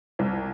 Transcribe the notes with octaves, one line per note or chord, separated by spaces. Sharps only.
C2